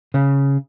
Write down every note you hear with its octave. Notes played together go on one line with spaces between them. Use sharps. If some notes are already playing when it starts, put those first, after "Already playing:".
C#3